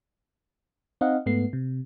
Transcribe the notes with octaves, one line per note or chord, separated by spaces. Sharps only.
C4 D#4 D#5 F5 F#5
G#2 A3 B3 C7
C3